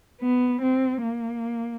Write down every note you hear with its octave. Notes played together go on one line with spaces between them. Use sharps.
B3
C4
A#3